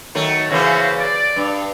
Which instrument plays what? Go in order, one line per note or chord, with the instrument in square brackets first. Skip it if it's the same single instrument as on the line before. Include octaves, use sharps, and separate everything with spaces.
[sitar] D#3 F#3 A3
[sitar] C#3 E3 A#3 [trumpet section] F#4 C5 E5
[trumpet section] D5
[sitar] G2